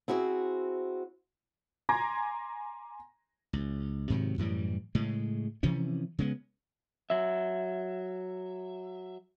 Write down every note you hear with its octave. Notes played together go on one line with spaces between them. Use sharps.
C4 E4 F#4 G#4 A#4 C5
G#5 A#5 C6 D6 G#6 A#6
C#2
G#2 C3 D#3 F#3
F#2 A2 E3 G3
A2 C#3 G#3
C3 E3 F3 C#4
C#3 G#3 B3
F#3 E5